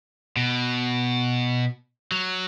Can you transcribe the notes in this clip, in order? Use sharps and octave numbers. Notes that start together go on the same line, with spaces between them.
B2
F#3